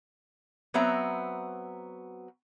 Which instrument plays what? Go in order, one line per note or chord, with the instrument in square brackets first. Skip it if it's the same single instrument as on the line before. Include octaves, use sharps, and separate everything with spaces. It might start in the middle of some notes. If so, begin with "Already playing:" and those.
[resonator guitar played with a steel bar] F#3 B3 C4 E5 A#5